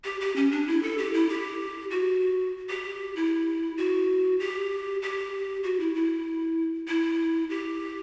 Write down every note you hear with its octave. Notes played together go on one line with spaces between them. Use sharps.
G4
G4
C#4
D4
E4
A4
G4
E4
G4
F#4
G4
E4
F#4
G4
G4
F#4
E4
E4
E4
G4